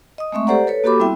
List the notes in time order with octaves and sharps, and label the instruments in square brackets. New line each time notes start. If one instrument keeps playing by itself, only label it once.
[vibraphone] D#5 D#6
G#3 A3 C4 E5 C#6
G4 A4 C5 D5 F#5 A#5
A4 B4 C#5
A#3 F#4 G4 A4 B5 D6
G3 B3 C4 E4 E5 G5